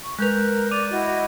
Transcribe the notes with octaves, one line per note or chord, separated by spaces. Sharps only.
C#6
G#3 A#4 B4 F#6 G6 F7
D5 D6 D#7 F7
E4 F#4 D#5